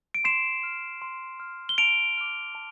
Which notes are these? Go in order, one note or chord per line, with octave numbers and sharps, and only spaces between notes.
D7
C6 C7 E7
F6
C6
F6
G7
A5 D7 F7
D6 F6
A5